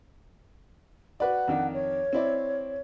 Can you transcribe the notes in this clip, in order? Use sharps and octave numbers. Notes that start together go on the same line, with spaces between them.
F#4 B4 D5 F#5
F2 D#3 D4
C#5
C4 E4 D5